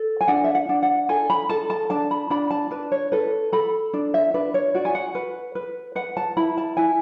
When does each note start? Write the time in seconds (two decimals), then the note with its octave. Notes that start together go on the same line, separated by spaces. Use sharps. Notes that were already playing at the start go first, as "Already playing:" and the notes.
Already playing: A4
0.21 G#5
0.28 D4 F#5
0.44 E5
0.55 F#5
0.69 D4
0.83 F#5
1.09 A4 G#5
1.30 B5
1.49 A4 A5
1.70 A5
1.90 D4 A5
2.11 B5
2.30 D4 B5
2.51 A5
2.71 D4 B4
2.92 C#5
3.12 A4 B4
3.52 A4 B5
3.94 D4
4.14 E5
4.34 D4 B4
4.54 C#5
4.74 F#4 D5
4.85 G#5
4.95 F#5
5.15 B4
5.55 B4
5.95 B4 F#5
6.17 A5
6.37 E4 B5
6.57 A5
6.77 E4 G#5